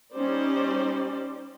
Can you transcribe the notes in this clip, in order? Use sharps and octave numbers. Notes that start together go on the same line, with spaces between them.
G3 C#4 D#4 C5 D5